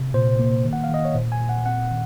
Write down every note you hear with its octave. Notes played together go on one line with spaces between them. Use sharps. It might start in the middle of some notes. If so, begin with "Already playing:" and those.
Already playing: C3
A#2 C5
A#3
D#3
F#5
F5
D#3 D#5
C#5
A#2 C5
G#5
A#2
F#5
C4 F#5
D#3